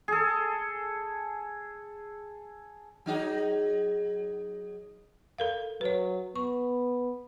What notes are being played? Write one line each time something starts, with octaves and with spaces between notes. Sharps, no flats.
G#4 A4
F#3 D#4 G#4
A4 A#4 F5
F#3 B4 C#5
B3 C#6